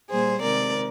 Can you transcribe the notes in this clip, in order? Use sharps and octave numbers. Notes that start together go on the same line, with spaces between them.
A#2 G3 A#3 G#4 C5
C3 D#3 G#3 C4 A#4 D5